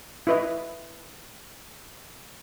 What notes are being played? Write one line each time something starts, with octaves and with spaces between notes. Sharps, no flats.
E4 B4 D#5